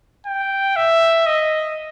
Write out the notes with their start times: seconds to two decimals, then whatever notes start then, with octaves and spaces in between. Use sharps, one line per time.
0.27 G5
0.76 E5
1.27 D#5